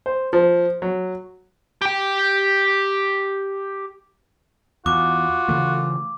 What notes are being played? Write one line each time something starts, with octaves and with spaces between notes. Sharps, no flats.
C5
F3
F#3
G4 G5
E2 F4 F#4 D6
C#3 E3 A3